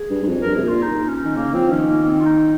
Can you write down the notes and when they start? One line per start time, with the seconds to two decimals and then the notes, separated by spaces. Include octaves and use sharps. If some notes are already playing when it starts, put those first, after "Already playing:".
Already playing: G#4
0.10 G2
0.23 G2
0.27 F2
0.41 G2 A#4
0.55 C3 G#4
0.64 A#2 F4
0.82 D#4
1.08 C#4
1.25 D#3
1.36 C#3 A#3
1.53 F3 C4
1.71 D#3 C#4
1.89 A#3
2.08 C4
2.20 F4
2.25 D#4